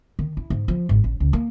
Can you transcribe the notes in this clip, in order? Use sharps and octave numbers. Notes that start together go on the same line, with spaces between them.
D#3
E4
G#2
F3
G#1
A1
C#2
A#3